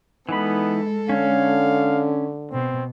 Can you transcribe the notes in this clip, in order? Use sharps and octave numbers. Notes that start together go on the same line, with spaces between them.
E3 G#3 B3 D#4 A4 B5
D3 C#4 C#5 F5
B2 C4